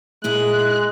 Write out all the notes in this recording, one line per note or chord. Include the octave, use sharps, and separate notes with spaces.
A#2 G#3 E4 G#4 F#6